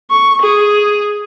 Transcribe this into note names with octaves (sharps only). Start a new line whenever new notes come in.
C#6
G#4